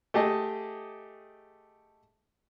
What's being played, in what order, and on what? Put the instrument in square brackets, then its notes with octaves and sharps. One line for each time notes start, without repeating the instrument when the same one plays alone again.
[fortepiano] A3 G4 G#4 D#5